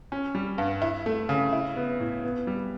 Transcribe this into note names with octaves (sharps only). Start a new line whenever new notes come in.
C#4
G3
G2
E4
A3
C#3
E4
B3
A2
B3
G3